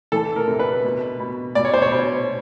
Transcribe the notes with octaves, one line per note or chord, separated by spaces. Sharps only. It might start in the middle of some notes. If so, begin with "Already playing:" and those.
E3 A4
A#4
C3
B4
B2
B2
B2 D5
C#5
C5
C#5
B2